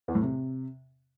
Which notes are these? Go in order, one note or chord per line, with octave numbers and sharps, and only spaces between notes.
E2
A2
C3